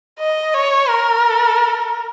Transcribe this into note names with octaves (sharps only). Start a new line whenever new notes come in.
D#5
C#5
A#4